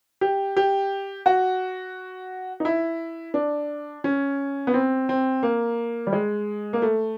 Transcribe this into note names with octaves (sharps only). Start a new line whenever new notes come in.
G4
G4
F#4
D#4
E4
D4
C#4
B3
C4
C4
A#3
G3
G#3
A#3
A3